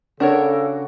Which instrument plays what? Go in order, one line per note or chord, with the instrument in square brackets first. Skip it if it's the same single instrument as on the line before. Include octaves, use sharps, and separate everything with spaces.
[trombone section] C#3 [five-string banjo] D4 A#4 C#5 [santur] F#4 [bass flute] A4